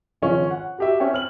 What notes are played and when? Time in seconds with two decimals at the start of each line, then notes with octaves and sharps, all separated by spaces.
0.22 G#1 C#3 F3 C#4 F4
0.51 F#5
0.78 F#4 G4 E5
1.00 C4 C#4 E5 G5
1.13 C4 F6 F#7